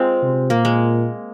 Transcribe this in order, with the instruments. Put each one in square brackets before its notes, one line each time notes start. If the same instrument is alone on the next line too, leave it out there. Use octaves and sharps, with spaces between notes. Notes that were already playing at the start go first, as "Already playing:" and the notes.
Already playing: [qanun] G#3 C4 F4
[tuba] C3
[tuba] A#2 [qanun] A#3
[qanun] G#3